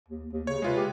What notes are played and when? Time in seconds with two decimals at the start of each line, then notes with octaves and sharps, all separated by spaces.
0.08 D#2
0.33 D#2
0.47 C#3 C#5
0.62 C3 G#3 F4 B4
0.76 G4